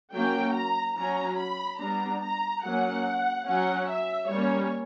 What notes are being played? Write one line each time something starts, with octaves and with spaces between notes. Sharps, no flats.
F#3 A#3 C#4 G5
A#5
F#3 C#4 A#5
B5
G3 B3 D4 A#5
A#5
F#3 A#3 C#4 F#5
F#3 C#4 F#5
E5
G3 A#3 C#4 C#5